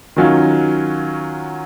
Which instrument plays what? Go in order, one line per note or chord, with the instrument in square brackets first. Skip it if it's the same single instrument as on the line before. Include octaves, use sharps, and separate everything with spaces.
[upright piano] D#3 F#3 C#4 F4